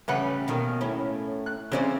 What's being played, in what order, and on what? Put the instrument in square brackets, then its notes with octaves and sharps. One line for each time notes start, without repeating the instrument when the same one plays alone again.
[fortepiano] A1 B4 F#5 [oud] C#3 G3 C#4
[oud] B2 D#3 A#3
A2 C#4 E4
[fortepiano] F#6
[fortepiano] C#3 C#4 [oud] E3 C4 D5